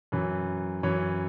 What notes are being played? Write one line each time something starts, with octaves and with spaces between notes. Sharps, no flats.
F#2 E3
F#2 E3 C#5